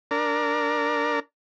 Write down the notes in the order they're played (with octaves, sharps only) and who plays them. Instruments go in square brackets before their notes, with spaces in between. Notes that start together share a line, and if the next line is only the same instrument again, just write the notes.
[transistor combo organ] D4 A#4